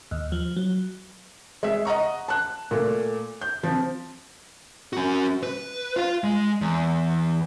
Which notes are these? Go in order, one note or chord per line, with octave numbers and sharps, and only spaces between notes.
D#2
F3
F#3
G#3 E5
D#5 F#5 A#5 C#6
A5 F#6
A#2 A3
G6
F3 C4
C#4 F#4
B4
F4 F5
G#3
E2